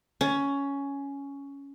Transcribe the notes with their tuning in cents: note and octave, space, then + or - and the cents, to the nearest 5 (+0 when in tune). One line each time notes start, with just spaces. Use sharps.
C#4 +10